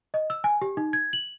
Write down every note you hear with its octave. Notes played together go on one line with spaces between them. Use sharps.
D#5
E6
G#5
G4
D#4
G#6
F#7